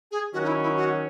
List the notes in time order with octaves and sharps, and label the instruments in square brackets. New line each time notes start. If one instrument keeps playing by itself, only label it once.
[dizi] G#4
[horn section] D#3 F#3 C#4 [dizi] F#4
[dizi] D#4
E4
D#4
E4
F#4